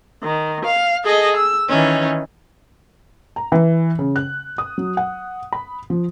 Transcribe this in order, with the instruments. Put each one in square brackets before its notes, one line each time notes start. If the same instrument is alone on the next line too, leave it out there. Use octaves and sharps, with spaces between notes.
[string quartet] D#3
F5
G#4 A4 D#5
E6
D#3 E3 C#4 D#4
[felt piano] A#5
E3
C#3
F#6
D#6
F#3
F#5
B5
F3